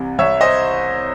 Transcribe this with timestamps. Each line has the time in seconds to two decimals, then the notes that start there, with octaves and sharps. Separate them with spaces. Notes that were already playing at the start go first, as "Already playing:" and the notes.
Already playing: C2 C3 E3
0.18 C2 C#5 E5
0.41 C5 D#5